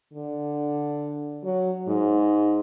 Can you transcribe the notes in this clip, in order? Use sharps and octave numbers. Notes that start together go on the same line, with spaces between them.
D3
F#3
G#2